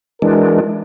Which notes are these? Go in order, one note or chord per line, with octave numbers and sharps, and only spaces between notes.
E3 G#3 D4 E4 F#4 A#4